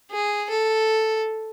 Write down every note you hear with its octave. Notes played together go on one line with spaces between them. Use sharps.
G#4
A4